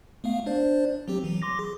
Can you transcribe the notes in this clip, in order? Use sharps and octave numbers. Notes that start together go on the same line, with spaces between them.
A3 B3 F5
D4 C5 D5
F#3 C4 G4
E3 F#3
C6 D6 A#6
G#4